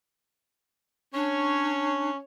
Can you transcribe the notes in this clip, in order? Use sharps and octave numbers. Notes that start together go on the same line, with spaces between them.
C#4 D4 C#5